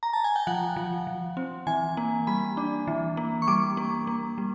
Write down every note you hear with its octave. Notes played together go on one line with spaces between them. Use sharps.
A#5
A5
G#5
G5
F3 F#5
F3
F3
C4
E3 G#5
A#3
G3 B5
D4
E3
A#3
C#6
G3 D6
A#3
A#3
G3